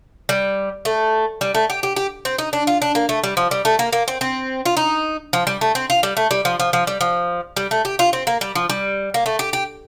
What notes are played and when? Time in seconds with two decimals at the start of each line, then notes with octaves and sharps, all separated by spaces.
0.29 G3
0.85 A3
1.41 G3
1.55 A3
1.70 G4
1.83 G4
1.96 G4
2.25 C4
2.38 D#4
2.53 D4
2.67 F4
2.82 D4
2.95 A#3
3.09 A3
3.24 G3
3.37 F3
3.51 G3
3.65 A3
3.79 A#3
3.93 A#3
4.08 C4
4.21 C4
4.65 F4
4.77 D#4
5.33 F3
5.47 G3
5.61 A3
5.75 C4
5.90 F4
6.03 G3
6.17 A3
6.31 G3
6.45 F3
6.60 F3
6.73 F3
6.87 G3
7.01 F3
7.56 G3
7.71 A3
7.85 G4
7.99 F4
8.13 C4
8.27 A#3
8.41 G3
8.55 F3
8.70 G3
9.14 A#3
9.26 A3
9.39 G4
9.53 G4